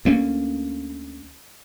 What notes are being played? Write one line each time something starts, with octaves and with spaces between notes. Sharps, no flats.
D2 A#3 C#4